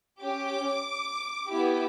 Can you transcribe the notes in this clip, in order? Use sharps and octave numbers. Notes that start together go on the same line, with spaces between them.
C#4 G4 D6
B3 E4 G4